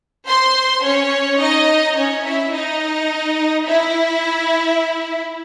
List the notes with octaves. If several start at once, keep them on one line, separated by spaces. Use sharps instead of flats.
C5 C6
C#4 C#5
D#4 D#5
C#4 C#5
E4 E5
D#4 D#5
E4 E5